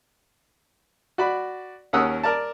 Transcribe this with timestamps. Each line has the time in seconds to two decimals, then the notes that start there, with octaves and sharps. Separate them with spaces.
1.18 F#4 D5 B5
1.93 D#2 C#4 A#4 F#5 D#6 E6
2.23 A#4 D5 A5